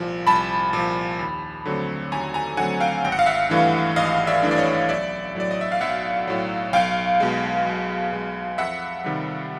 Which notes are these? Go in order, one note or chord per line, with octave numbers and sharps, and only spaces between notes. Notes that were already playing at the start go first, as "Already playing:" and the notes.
Already playing: C2 A#2 F3
C2 A5 B5
A#2 F3
D#2
D3 F#3 A3 C4
D#2 G#5 A#5
G#5 A#5
D3 F#3 A3 C4 F#5 G#5
F5 G5
G#1 G5
F#5
F5
E5 F#5
G2 E3 A3 D4
G#1 D#5 F5
D5 E5
G2 E3 A3 D4
D5
C#5 D#5
B1 D5 E5
A2 F#3 D5
D#5
E5
F5
B1 E5 F#5
A2 F#3
B1 F5 G5
B2 G#3
B1
B2 G#3
F2 E5 F#5
C3 D#3 G3